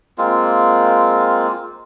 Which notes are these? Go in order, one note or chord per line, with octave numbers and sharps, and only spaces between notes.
G#3 A#3 C4 F4